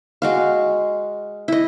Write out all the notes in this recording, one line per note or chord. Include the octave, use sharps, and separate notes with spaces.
G#3 F#4 F5
E4 D#5